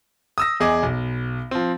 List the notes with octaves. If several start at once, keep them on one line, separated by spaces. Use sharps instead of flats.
D#6 E6 A#6
E2 G#4 D#5 D6
B1
F3 C4